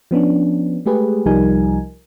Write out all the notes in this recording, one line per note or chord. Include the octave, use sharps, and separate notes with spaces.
F3 B3 C#4 D4
G#3 A3 G4 G#4 B4
C2 F3 G3 D#4 A#4 G#5